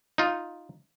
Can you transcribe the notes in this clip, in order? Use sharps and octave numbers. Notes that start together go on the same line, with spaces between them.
D#4 F4